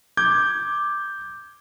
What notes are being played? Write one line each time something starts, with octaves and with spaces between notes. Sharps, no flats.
D6 G6 G#6